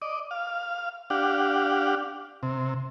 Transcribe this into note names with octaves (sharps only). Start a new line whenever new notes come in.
D5 D#5
F5
D4 G4 F5 F#5
C3